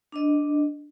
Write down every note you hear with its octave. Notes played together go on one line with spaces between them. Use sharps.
D4 D#5